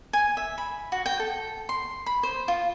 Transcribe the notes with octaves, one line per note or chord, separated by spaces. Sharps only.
G#5
E5
B5
F#4
G5
A4
C6
B5
C5
F4